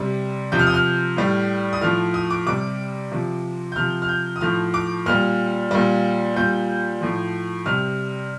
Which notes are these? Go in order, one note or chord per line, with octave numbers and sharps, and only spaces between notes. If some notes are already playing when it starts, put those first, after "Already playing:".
Already playing: C3 G3
C3 F3 G6
F6
D#6
F6
A2 G3
D#6
A2 F3 F6
D#6
D6
C3 G3 D6
C3 F3
G6
C3 F3 F6
F6
G6
D#6
A2 F3 F6
D6
A#2 G3 F6
A#2 G3
A#2 G3 G6
A2 F3
C3 G3 F6